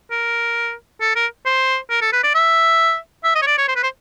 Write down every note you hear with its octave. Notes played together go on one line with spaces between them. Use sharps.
A#4
A4
A#4
C5
A#4
A4
B4
D5
E5
E5
D#5
C#5
D5
C#5
C5
B4
C5